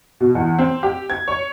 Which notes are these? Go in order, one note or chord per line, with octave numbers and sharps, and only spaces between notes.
B2
E2
C4
G4
G#6
C#5